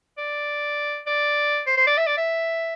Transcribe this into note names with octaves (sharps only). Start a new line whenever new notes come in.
D5
D5
C5
C5
D5
E5
D5
E5